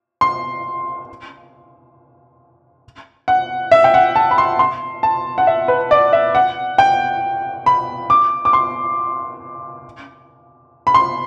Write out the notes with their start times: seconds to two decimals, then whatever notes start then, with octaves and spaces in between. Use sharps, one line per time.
0.21 C6
3.28 F#5
3.72 E5
3.84 G5
3.94 F#5
4.16 A5
4.31 B5
4.38 C6
4.59 C6
5.03 A5
5.38 F#5
5.47 E5
5.68 B4
5.91 D5
6.13 E5
6.35 F#5
6.78 G5
7.66 B5
8.10 D6
8.45 D6
8.53 C6
10.87 B5
10.94 C6